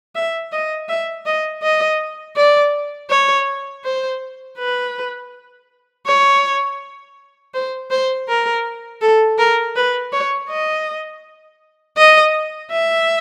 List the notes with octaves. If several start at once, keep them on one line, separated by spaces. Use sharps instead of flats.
E5
D#5
E5
D#5
D#5
D5
C#5
C5
B4
C#5
C5
C5
A#4
A4
A#4
B4
C#5
D#5
D#5
E5